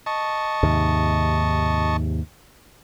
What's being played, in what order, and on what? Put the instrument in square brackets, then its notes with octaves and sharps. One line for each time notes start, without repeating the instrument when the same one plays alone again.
[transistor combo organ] D#5 A5 C#6
[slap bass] D#2 G#2 C3